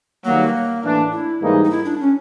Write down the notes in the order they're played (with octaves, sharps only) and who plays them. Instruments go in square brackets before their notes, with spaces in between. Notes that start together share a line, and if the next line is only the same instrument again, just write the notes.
[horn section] G2 D#3 F#3 [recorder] A#3
[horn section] A2 E3 A3 D4
[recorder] E4
[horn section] G#2 E3 G3 A#3 D#4
[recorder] D#4
E4
D4
C#4